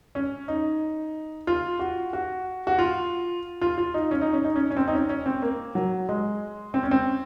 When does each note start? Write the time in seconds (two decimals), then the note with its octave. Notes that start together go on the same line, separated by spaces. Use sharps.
0.15 C#4
0.48 D#4
1.47 F4
1.79 F#4
2.13 F#4
2.67 F#4
2.79 F4
3.61 F4
3.78 F4
3.94 D#4
4.11 C#4
4.22 D#4
4.33 C#4
4.44 D#4
4.56 C#4
4.71 C#4
4.77 C4
4.88 D#4
4.93 C#4
5.09 C#4
5.26 C4
5.42 A#3
5.75 F#3
6.09 G#3
6.74 C4
6.83 C#4
6.91 C4